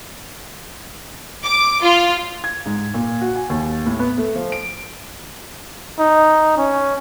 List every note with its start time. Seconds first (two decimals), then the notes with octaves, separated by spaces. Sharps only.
1.44 D6
1.84 F4
2.44 G#6
2.66 G#2
2.94 A#2
3.21 F#4
3.36 G#5
3.50 D#2
3.86 A2
3.99 B3
4.18 A3
4.35 F3
4.52 D7
5.99 D#4
6.57 C#4